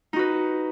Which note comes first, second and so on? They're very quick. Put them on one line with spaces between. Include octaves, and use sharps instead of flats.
D#4 F#4 B4